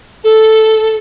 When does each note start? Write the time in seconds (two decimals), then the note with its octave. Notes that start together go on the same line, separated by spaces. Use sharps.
0.24 A4